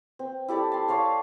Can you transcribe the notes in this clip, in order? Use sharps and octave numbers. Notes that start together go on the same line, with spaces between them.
C4
E4 G4 A4 D5
A5 C6
C#5 D5 F5 C6